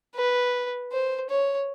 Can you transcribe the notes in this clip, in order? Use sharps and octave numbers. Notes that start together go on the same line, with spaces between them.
B4
C5
C#5